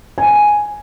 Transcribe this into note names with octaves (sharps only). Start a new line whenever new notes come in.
G#5